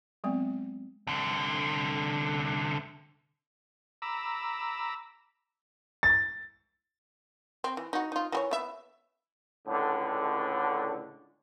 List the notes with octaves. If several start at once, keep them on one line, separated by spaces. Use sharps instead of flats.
F#3 G#3 B3 C4
C2 D3
A#5 B5 D6 E6
A6
C4
E3
D#4 F#4
D#4 F4
E3 G4 C#5
B3 E5
C#2 A2 D3